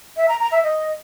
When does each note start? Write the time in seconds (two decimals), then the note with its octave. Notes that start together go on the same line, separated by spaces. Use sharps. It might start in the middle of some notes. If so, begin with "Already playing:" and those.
0.17 E5
0.28 A#5
0.40 A#5
0.52 E5
0.63 D#5